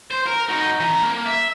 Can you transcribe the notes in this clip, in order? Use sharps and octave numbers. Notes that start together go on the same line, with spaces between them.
C5
A#4
D#4 F#4
E3 A#5
A#3
E5